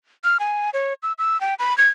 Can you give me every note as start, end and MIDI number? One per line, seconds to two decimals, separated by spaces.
0.24 0.38 89
0.40 0.70 80
0.73 0.94 73
1.03 1.13 88
1.18 1.40 88
1.41 1.54 79
1.59 1.76 83
1.78 1.88 92